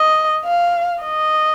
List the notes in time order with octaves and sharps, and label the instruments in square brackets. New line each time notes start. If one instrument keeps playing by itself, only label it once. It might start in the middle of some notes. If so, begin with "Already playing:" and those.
Already playing: [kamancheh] D#5
F5
D#5